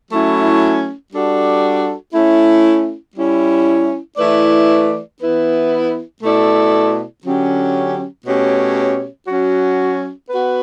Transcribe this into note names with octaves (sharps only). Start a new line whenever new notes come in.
F#3 A3 C#4 E4
G3 D4 F#4 A4 D5
A3 C#4 E4
G3 C#4 E4
E3 A3 E4 B4 D5
E3 B3 E4 B4
B2 A3 E4 A4 D5
D3 F#3 C#4 G4
B2 A3 C#4 G4 C#5
F#3 C#4 F#4
B3 F#4 B4